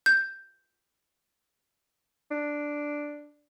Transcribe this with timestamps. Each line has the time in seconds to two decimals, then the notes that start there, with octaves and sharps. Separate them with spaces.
0.06 G6
2.31 D4